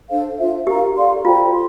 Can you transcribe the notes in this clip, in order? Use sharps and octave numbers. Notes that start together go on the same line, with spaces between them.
D4 A4 C5 F5
D4 F4 C5 E5
G4 A#4 F5 A#5
A4 D5 F5 C6
F4 A4 C5 G5 A#5
C6